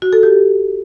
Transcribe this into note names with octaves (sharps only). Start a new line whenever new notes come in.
F#4
A4
G4